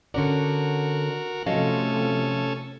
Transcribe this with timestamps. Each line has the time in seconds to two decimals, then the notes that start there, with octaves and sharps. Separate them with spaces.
0.14 D3 C#4 F#4 A#4 D5
1.46 C3 F3 A3 C#4 F#4 A4 D#5 F5